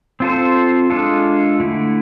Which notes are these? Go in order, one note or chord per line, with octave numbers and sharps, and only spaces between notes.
C4 F4 A4 C5
G#3 D4 F4 A4
D3 A3 E4